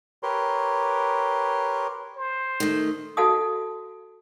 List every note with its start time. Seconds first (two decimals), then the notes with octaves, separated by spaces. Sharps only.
0.23 G4 A#4 B4 C#5 C6
2.16 C5
2.60 D#3 A3
3.17 F#4 A4 D#5 F5 A5 D#6